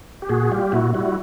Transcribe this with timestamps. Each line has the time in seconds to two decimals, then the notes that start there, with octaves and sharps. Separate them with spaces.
0.22 G4
0.29 A#2 F#4 G#4
0.51 G3 F4 G4
0.72 A#2 E4 F#4
0.93 G3 E4 F#4